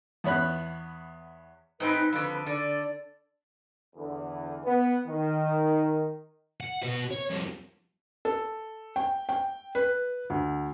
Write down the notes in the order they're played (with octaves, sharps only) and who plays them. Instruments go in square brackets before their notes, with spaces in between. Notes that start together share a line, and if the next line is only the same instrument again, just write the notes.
[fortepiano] E2 B3 C#5 B5 F#6
[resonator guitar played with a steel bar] G#2 C4 D#4 [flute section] B4
[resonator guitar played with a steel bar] F2 D3
[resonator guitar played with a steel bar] D3 [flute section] D5
[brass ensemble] E2 D3
B3
D#3
[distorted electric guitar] F#5
B2 B4
C#5
F2 G3
[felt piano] A4
G5
G5
B4
D2